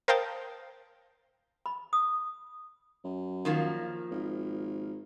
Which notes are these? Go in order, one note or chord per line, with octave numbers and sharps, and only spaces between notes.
A#4 C5 F5 G5 A5 D#6
B5
D#6
F#2
D#3 F3 A#3
G#1